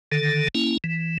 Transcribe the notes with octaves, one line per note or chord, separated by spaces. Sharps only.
D3 D#3 A4
A#3 C#4 E4
E3